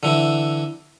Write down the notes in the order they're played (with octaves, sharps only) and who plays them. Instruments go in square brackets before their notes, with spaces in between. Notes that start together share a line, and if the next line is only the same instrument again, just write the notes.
[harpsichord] D3 E3